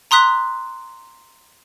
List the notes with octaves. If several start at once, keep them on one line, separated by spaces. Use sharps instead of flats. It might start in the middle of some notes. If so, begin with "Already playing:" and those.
A#5 C6 D#6 F#6 B6